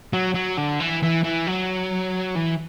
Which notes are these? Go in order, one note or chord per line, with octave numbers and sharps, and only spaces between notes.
F#3
F#3
D3
E3
E3
E3
F#3
E3